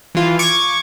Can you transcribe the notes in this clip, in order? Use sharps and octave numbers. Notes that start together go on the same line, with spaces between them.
E3 F4
C#6 D6 G#6